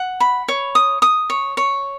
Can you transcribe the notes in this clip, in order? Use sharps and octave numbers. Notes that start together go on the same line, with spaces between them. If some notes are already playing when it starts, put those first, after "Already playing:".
Already playing: F#5
B5
C#5
D#6
D#6
C#5
C#5